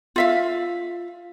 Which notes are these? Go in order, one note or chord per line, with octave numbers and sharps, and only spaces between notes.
F4 E5 F5